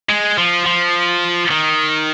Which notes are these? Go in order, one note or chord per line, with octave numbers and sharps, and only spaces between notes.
G#3
F3
F3
D#3